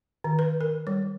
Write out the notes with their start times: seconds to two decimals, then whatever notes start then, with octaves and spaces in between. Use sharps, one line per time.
0.24 D#3
0.39 B4
0.61 A#4
0.87 G3